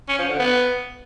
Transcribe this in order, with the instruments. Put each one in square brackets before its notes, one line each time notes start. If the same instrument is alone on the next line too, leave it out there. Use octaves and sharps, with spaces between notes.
[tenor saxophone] C#4
F3
D3
B3